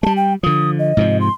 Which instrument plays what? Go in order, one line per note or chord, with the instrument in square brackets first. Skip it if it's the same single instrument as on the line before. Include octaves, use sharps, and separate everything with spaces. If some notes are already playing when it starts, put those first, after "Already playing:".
[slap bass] G3 G#3 [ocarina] A5
[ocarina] G5
[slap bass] D3 F3 [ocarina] D#6
[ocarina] D#5
[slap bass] G#2 C3 F3
[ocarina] C6